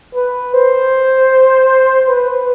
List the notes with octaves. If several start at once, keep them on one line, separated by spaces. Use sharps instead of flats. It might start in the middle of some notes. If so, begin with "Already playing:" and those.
B4
C5
B4